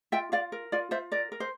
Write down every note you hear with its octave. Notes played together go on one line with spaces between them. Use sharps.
F4 E5 G5
F4 D5 F5
A#4
F4 D5
F4 C5 E5
A#4 D5
A#4
C5